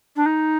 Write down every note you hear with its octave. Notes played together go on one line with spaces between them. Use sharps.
D4
D#4